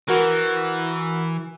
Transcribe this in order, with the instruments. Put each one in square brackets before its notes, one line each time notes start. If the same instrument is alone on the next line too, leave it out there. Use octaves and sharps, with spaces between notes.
[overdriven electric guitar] E3 [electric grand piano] F#4 A#4